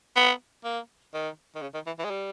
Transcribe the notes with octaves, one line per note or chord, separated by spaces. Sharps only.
B3
A#3
D#3
D#3
C#3
D#3
E3
E3
G#3
G3